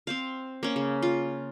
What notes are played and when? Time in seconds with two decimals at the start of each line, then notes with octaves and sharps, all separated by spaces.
0.07 C4 C5 F5
0.63 A#3 C#4
0.76 C#3
1.02 F4